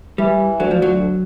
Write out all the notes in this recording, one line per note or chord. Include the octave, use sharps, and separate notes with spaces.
E3 G3
D2 F#3
F3
F#3